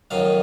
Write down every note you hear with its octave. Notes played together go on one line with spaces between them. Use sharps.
F2 D#3 F#3 F5